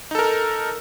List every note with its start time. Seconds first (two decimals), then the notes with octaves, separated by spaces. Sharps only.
0.11 D#4
0.15 A4
0.19 A#4